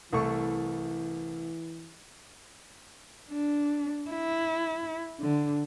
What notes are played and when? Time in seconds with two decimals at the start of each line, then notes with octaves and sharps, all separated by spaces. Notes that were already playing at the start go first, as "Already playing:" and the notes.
0.12 C2 E3 A3 C#6
3.30 D4
4.10 E4
5.20 D3